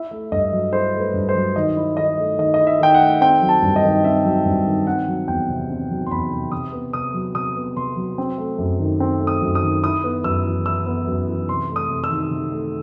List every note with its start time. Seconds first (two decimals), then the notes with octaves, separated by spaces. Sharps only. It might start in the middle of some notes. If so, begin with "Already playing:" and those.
Already playing: E4 E5
0.11 A3
0.32 G2 D#5
0.52 F#3
0.73 E4 C5
0.94 A3
1.00 B4
1.14 G2
1.29 C5
1.35 F#3
1.56 D#3 D#5
1.76 E4
1.97 D#3 D#5
2.18 A3
2.38 D#3 D#5
2.54 D#5
2.60 E4
2.67 E5
2.80 D#3 G5
2.94 F#5
3.01 A3
3.21 C4 G5
3.41 F#3
3.49 A5
3.62 G2
3.76 D#5
3.84 D#3
4.04 C4 E5
4.24 F#3
4.46 G2
4.67 D#3
4.87 C4 F#5
5.07 F#3
5.28 E2 G5
5.49 C3
5.70 C4
5.90 F#3
6.06 C6
6.11 E2 B5
6.31 C3
6.52 C3 D#6
6.72 B3
6.93 C3 D#6
7.14 F#3
7.35 C3 D#6
7.56 B3
7.76 C3 C6
7.96 F#3
8.18 C4
8.38 A3
8.58 F#2
8.79 D#3
9.00 C4
9.21 A3
9.27 D#6
9.42 F#2
9.55 D#6
9.63 D#3
9.83 E4 D#6
10.04 B3
10.24 F#2 E6
10.46 E3
10.66 E4 E6
10.86 B3
11.07 F#2
11.28 E3
11.49 C3 C6
11.70 A3
11.76 D#6
11.89 C3
12.04 E6
12.10 D#3
12.31 C3
12.52 A3